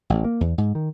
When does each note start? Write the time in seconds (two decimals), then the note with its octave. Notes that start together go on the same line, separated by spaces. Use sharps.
0.10 A1
0.24 A#3
0.41 E2
0.58 G#2
0.75 D#3